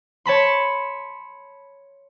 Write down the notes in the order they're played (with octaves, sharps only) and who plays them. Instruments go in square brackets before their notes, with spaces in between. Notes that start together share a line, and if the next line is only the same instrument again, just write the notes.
[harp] C#5 A5 B5 C6